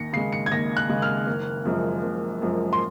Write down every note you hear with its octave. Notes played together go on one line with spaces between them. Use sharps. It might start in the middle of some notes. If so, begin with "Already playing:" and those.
Already playing: D#2 A#6 C#7
C#3 G#3 C7
C#7
G#6
D#2 A#6
F#6
C#3 G#3
F6
F#1
F#2 F3 G#3
F#1
F#2 F3 G#3
C6